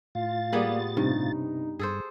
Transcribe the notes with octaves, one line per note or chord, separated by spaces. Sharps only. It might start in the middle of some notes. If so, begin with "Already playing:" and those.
A2 F4 F5 A6
G3 A#3 B3 G#4 D5
G2 C3 D#4
G2 G#4 A4 C5